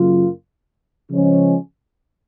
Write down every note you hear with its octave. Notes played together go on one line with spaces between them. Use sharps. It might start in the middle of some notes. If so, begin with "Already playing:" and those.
Already playing: F#2 C#3 F#3 A#3 F4
C#3 F3 G#3 C#4